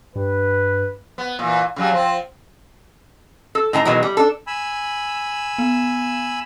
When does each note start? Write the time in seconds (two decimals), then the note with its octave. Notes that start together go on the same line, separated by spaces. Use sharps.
0.15 G2 B4
1.18 B3
1.39 A#2 E3
1.76 C#3 F#3 G3
1.91 F3 C4
3.55 A4
3.73 A2 D#3 A5 A#5
3.85 B2 D#3 E3 F#3 G#3
4.03 G3
4.17 D4 A4
4.47 G#5 B5 E6
5.58 B3